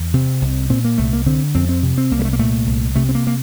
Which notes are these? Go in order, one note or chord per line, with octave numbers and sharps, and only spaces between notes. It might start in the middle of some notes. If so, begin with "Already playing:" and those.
Already playing: E2
C3 C4
C2
A#2 C4
A#3
C2 A3
A#3
D3 C4
F2 C4
C4
C3
C4
C2 A#3
G3
A3
A#3
A#2 A3
C2
C3 A3
C4
A#3
A#3